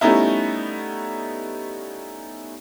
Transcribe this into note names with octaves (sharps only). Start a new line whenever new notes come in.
G3 A3 B3 C#4 D#4 E4